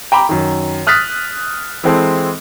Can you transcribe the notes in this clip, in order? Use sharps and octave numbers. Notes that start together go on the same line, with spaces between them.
G5 A#5 B5 D6
F#2 D#3
D#6 F6 F#6 A6 B6
E3 G#3 C4 A4